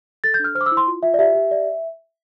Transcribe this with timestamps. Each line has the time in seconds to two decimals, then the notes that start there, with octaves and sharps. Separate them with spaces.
0.24 A4 A6
0.34 G6
0.40 D4 F6
0.55 C5 F6
0.61 D6
0.66 E6
0.72 E4
0.77 C6
0.87 F4
1.03 F4 E5
1.14 D5
1.19 G4 E5
1.35 G4
1.51 D5